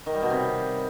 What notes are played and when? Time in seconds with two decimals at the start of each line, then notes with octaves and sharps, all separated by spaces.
0.06 D#3
0.14 G3
0.22 B2
0.30 C3